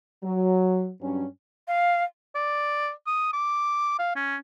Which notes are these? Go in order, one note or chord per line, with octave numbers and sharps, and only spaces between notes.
F#3
G2 F#3 C#4
F5
D5
D#6
D6
F5
C#4